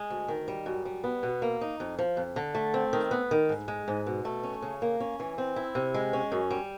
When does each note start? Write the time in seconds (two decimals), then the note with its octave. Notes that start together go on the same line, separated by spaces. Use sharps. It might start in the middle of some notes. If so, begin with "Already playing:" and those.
Already playing: G#3
0.10 D2
0.28 D#3
0.48 G3
0.66 F#2
0.85 G3
1.04 B3
1.23 B2
1.42 A#3
1.61 D#4
1.80 F2
1.99 F3
2.17 F2
2.36 D3
2.55 A3
2.74 C4
2.93 D#3
3.11 B3
3.31 D#3
3.49 G#2
3.68 G#3
3.88 G#2
4.06 B2
4.25 A3
4.43 C#4
4.62 C#3
4.82 A#3
5.00 C#4
5.20 E3
5.38 C4
5.56 E4
5.75 C3
5.94 G#3
6.13 C#4
6.32 F#2
6.51 G3